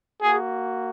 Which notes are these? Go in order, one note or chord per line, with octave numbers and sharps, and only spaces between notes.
A#3 F#4 G#4